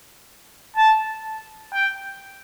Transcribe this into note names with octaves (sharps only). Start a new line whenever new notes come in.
A5
G5